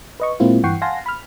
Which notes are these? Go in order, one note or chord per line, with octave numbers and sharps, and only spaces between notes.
B4 D#5 C#6
A#2 G#3 A#3 C4 E4 F4
G2 E3 F#5 G5 C#6 C7
F5 F#5 G#5 A5 C6 A#6
B5 F6